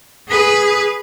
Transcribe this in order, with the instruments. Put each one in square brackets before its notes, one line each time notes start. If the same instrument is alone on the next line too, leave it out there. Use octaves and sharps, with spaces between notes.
[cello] G#4 B4